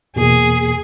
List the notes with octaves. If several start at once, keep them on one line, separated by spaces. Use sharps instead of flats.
E2 B2 A#3 G#4